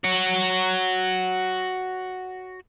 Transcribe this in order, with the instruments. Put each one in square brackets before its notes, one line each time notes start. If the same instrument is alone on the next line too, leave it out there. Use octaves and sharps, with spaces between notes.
[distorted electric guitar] F#4 C#5